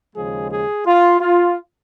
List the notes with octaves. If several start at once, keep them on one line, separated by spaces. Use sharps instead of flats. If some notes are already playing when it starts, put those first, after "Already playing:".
D#2 C#3 F3 G#3 G#4
G#4
F4
F4